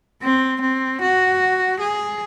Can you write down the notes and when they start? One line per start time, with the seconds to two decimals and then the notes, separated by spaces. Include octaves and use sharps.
0.22 C4
0.61 C4
1.01 F#4
1.80 G#4